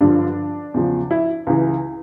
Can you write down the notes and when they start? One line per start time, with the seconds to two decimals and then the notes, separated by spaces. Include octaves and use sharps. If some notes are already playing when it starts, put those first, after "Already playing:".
0.01 G2 D3 F3 D4
0.74 E2 C#3 F3
1.11 E4
1.47 C#2 C#3 E3